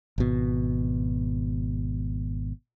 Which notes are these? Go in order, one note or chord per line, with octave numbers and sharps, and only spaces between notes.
G#1 B2